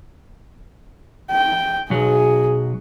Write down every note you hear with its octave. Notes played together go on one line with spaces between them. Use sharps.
G5
B1 F#3 G#4